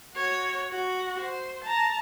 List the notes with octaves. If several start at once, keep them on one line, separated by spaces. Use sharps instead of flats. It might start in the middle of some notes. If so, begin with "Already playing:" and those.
F#4 C#5
F#4
C5
A5 A#5